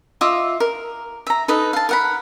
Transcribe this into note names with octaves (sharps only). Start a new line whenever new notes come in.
F4 D#5 E5 D6
A#4
E5 A#5
D#4 A4 B4
F5 A5
A#4 F#5 B5